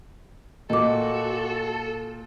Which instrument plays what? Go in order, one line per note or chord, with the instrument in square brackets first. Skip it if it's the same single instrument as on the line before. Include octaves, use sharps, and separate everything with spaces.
[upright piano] A#2 [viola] F#4 [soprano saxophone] A4 [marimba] D#5 D6